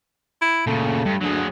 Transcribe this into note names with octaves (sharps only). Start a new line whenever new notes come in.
E4
A#2 C#3 A3
G2
D2 F#3 G#4